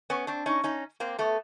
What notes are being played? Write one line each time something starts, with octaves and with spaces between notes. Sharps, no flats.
B3 C#4
C4 D4
C#4 D#4
C#4 D#4
A#3 C4
A3 B3